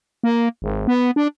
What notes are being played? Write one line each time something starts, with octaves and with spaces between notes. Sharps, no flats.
A#3
G#1
B3
D4